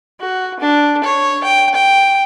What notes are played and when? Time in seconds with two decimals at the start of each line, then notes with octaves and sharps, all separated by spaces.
0.20 F#4
0.60 D4
1.04 C#5
1.44 G5
1.74 G5